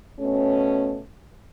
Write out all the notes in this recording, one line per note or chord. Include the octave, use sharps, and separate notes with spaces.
B2 A3 C#4